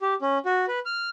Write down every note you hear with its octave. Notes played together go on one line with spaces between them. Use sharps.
G4
C#4
F#4
B4
F6